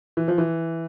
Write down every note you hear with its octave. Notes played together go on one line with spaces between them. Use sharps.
E3
F3
E3